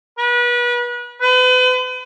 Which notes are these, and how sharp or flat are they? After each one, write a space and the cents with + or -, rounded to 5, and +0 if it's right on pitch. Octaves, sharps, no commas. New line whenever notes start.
B4 -30
B4 +40